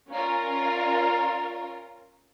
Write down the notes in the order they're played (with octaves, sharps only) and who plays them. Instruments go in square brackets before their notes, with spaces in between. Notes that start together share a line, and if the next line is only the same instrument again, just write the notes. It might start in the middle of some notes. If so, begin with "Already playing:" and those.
[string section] C#4 F4 A#4 [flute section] D5 F5 A#5